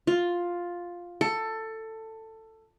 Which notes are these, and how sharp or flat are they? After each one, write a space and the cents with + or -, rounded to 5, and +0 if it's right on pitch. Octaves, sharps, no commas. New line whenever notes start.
F4 +5
A4 +15